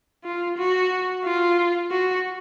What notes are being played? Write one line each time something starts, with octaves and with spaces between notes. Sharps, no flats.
F4
F#4
F4
F#4